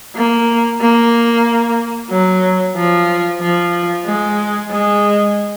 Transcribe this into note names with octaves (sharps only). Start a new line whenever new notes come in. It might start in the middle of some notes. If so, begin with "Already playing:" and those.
A#3
A#3
F#3
F3
F3
G#3
G#3